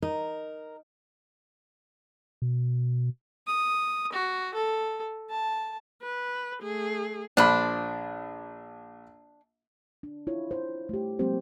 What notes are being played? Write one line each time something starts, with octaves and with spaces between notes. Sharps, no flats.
D#4 A#4
B2
D#6
F#4
A4
A5
B4
A3 G#4
A#1 F3 D4 B5
D4
E4 F4 C#5
C5
A3 G4
F#3 G#3 A#3 C4 G4 C5